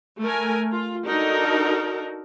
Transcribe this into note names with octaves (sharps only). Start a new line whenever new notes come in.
A3 A#4 G#5
F4
D4 D#4 F#4 A4 A#4